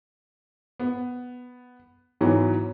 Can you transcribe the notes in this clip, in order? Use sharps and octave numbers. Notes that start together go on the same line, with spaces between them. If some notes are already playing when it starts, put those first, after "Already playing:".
B3
G#2 E3 F#3 B3